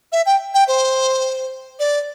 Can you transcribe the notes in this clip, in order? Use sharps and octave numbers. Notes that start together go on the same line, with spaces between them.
E5
G5
G5
C5
D5